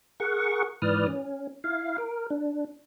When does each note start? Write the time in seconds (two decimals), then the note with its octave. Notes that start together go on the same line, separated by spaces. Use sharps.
0.20 G#4 A#4 F#5 C#6
0.82 G#2 E3 B4 D5 D#6 F6
1.08 C#4
1.64 E4 F5
1.98 A#4
2.30 D4